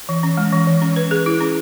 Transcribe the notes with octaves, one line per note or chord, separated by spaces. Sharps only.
E3
C#4
G#3
E3
E3
C#4
B4
G#4
E4
C#4